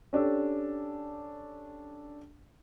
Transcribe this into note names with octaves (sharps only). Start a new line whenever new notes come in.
C#4 D4 G4 A4